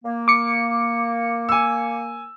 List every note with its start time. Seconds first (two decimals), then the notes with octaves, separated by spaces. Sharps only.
0.04 A#3
0.28 D6 C#7
1.49 G#5 E6